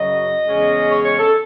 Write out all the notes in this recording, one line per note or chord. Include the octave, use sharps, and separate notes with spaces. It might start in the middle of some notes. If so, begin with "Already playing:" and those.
Already playing: F#2 C#3 F#3 D#5
E2 C#3 G#3 C#4
C#5
C#5
A4